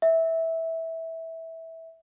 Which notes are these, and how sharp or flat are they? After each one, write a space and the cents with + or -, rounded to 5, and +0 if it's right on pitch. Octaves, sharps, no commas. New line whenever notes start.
E5 -15